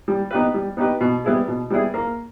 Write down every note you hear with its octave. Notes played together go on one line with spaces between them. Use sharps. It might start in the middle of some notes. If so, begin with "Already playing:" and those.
G3
B3 D#4 G4 B4
G3
B3 D#4 G4 B4
B2
G3 B3 E4 G#4
B2
G3 B3 E4 G#4
A#3